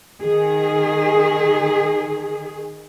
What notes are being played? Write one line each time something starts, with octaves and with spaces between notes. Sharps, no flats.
D#3 G#4